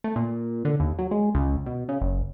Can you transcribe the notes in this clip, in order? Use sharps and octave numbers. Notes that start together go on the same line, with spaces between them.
A3
A#2
D3
D#2
F#3
G#3
C#2
B2
C#3
F#1